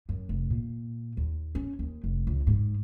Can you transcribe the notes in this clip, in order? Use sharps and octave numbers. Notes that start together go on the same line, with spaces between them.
F#2
F1
A#2
D#2
C#4
D#2
F1
C#2
G#2